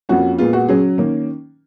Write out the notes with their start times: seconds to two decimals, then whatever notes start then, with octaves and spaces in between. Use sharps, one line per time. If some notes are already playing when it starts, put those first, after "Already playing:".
0.09 F2 F3 A#3 C#4 F#4
0.39 A#2 G#3 B3 F4
0.53 F#4
0.68 C#3 F#3 C#4 G#4
0.98 D#3 A#3 C#4